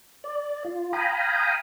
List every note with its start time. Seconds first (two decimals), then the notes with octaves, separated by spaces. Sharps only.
0.24 D5
0.65 F4
0.93 F5 G5 G#5 A#5 B5 D#6